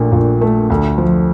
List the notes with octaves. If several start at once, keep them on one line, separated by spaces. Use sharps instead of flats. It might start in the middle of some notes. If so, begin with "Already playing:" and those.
Already playing: A#1 A#2 A3 D4
A#1
A3
D2
F3